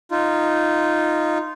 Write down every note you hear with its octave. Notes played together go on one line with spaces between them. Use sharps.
D#4 F4